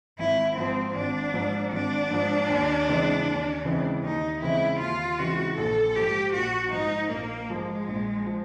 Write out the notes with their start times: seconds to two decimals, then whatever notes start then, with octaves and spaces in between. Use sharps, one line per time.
0.19 G#1 E4
0.57 G#2 F3 C4
0.95 G#1 D4
1.34 G#2 F3
1.72 G#1 D4
2.11 G#2 F3
2.50 D#2
2.88 C#3 E3 G#3 C4
3.26 D#2
3.65 C#3 E3 G#3 C4
4.03 D#2 D#4
4.41 C#3 E3 G#3 C4 E4
4.80 D#2 F4
5.18 C#3 E3 G#3 C4 F#4
5.58 A#1 A4
5.95 G#2 F3 G4
6.34 A#1 F#4
6.72 G#2 F3 D#4
7.11 A#1 A#3
7.50 G#2 F3 G#3
7.88 A#1
8.26 F3